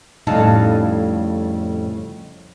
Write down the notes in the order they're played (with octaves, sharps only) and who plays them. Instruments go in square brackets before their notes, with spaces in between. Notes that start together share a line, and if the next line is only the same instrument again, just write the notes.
[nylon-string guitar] F2 A2 C#3 G3 D#4 A5